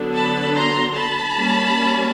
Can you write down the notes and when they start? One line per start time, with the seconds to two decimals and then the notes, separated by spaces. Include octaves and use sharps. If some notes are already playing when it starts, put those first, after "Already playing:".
Already playing: D3 F#3 B3 D4
0.15 A5 B5
0.56 A#5 C6
0.95 A5 B5
1.36 G3 A#3 C#4